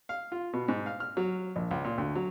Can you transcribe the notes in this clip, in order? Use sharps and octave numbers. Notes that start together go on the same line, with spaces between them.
F5
F4
B2
G#2
F5
F6
F#3
A#1
C#2
A#2
D2
F#3